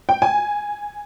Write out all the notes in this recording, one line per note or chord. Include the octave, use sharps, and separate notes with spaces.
G5
G#5